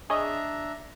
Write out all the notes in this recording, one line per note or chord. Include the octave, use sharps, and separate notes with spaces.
D4 G#4 C#5 D#5 E5 A#5